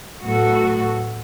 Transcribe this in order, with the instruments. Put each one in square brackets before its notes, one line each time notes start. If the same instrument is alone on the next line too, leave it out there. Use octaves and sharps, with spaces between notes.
[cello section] A2 F#3 B3 F#4 A4